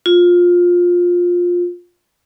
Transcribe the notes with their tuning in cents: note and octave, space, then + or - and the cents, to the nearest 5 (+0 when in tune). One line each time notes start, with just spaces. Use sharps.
F4 +15